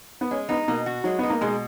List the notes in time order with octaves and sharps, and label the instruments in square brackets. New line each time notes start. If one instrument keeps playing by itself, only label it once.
[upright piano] B3
[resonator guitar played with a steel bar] G#3 [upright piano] C#4
[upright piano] B3 [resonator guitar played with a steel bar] D#4
[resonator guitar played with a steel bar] B2 [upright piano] A#3
[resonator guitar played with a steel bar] F#4
[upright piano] F#3 [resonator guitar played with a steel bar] G#3
[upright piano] B3 [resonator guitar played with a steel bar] D#4
[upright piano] A#3
[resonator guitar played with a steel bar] B2 [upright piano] G#3